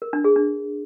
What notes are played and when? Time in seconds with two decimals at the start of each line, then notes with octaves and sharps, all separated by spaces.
0.02 A#4
0.13 D4
0.24 G#4
0.36 D4